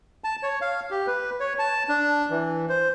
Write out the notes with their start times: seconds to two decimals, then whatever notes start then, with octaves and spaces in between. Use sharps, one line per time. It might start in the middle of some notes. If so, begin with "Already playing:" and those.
0.24 A5
0.43 C#5
0.61 F5
0.91 G4
1.07 B4
1.40 C#5
1.59 A5
1.89 D4
2.30 E3
2.69 C5